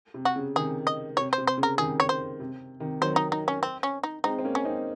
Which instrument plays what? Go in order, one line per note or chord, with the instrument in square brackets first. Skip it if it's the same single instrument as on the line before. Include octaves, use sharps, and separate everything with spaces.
[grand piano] C3
[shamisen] F#4
[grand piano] C#3
[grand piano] C3 D#3 [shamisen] G#4
[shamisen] D#5
[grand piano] C3 [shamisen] C#5
[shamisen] C5
[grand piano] C3
[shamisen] C5
[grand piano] C#3
[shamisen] A#4
[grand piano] C3 D#3 [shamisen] G#4
[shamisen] C#5
C5
[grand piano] C3
C3 D#3
[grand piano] D#3 F#3 [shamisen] C5
[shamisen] D#4
D#4
C#4
C4
C#4
D#4
[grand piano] G#3 C4 [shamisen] D#4
[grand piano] C4
A#3 C#4
[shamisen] C#4
[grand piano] C4 D#4